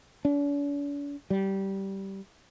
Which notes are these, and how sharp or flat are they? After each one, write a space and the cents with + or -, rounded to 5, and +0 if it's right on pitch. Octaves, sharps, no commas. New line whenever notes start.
D4 -45
G3 -15